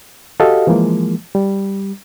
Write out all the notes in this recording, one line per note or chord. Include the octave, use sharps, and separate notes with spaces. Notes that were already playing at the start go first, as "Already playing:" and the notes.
F#4 G4 A4 D#5 F5
E3 F3 G#3 A#3
G3